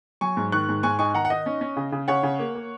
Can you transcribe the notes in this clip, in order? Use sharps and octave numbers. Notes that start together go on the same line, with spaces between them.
F#3 G#5 C#6
G#2
D#3 C#6 F#6
G#2
G#2 G#5 C#6
D#4 G#5 C#6
D#3 F#5 A#5
F#5
D#4 D#5
C#4
C#4
C#3
C#3
C#3 C#5 F#5
C#3
A#3
A#3